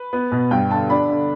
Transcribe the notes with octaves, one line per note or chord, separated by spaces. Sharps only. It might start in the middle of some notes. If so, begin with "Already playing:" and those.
Already playing: B4
B3
B2
G2 G5
D3 A5
D4 B5
D3